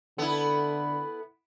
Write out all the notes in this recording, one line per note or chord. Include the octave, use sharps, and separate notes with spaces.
D3 B3 E4 A4